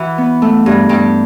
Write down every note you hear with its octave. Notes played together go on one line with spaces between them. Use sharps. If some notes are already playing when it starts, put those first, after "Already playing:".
Already playing: E3 E4 F#4
B3
A3
G2
G2 G4